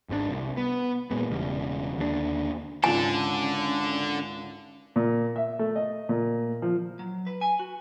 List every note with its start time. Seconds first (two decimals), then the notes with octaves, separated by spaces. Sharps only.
0.09 G#1 G#2 B2 D4
0.30 C2
0.57 B3
1.11 A#2 G#3 B3
1.30 E1 C#3 G3
1.98 D#2 D3 A3 D4
2.84 G#1 C#2 D3 C#4 A4 G#5 C7
4.96 A#2
5.36 E5
5.59 A3
5.76 D#5
6.09 A#2
6.62 F3
6.99 F#3
7.27 B4
7.41 G#5
7.59 F#4